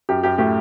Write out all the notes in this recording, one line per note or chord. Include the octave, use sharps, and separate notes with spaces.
F#2 G4
F#2 G4
A2 G4